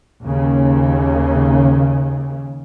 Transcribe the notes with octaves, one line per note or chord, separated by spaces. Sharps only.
D#2 C#3